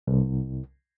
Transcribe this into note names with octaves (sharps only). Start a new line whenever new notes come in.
C2